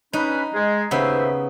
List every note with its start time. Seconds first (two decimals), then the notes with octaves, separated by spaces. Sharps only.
0.13 C#4 D#4 B4
0.54 G#3
0.91 D#2 C#3 B3 C5 E5